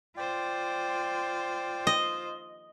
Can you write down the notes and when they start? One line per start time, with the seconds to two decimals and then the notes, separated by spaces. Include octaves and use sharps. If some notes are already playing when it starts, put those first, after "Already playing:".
0.17 F4 C5 D5 G5
1.87 D#5